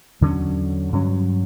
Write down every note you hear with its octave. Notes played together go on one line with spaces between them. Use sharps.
E2 D3 F#3 C#4
G2 F#3 C#4